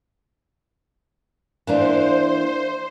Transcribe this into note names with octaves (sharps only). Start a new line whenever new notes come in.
E3 A#3 D4 C5